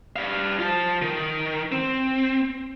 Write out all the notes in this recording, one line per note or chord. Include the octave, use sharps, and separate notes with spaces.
G3 F5
F4 A5
D#3
C4